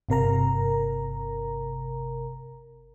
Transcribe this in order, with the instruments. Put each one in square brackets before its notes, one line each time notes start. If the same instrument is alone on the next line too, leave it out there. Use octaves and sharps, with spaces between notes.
[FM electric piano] G1 C3 A#4 A#5